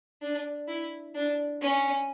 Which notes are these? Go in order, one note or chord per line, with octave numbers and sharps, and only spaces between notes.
D4
E4
D4
C#4